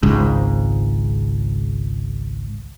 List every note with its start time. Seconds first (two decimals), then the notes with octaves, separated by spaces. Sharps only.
0.03 G#1 C#2 G#2